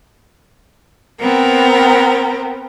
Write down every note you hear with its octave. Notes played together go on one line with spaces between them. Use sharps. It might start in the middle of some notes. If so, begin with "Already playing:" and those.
B3 C4 A#4